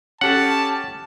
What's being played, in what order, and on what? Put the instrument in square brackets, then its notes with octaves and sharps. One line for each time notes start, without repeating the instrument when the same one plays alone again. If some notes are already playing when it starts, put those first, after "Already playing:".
[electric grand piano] C#4 G4 A4 [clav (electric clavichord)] F#5 [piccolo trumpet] A5